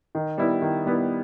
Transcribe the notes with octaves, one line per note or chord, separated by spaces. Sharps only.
D#3
G3 B3 E4
D#3
G3 B3 E4